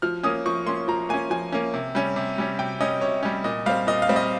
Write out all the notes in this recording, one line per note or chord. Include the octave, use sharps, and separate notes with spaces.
F3 F6
A#3 C#4 D#6
F3 C#6
A#3 C#4 C6
F3 A#5
A#3 C#4 G#5
F3 G#5
A#3 C#4
C3
G3 C#4
C3
G3 C#4
C3 G5
G3 C#4 D#5
C3 C#5
G3 C#4
A#2 D#5
G3 C4 F5
A#2 D#5
F5
G3 C4
D#5